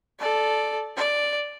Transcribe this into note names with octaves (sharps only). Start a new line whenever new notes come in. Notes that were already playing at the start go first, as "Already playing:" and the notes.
A4 D5
D5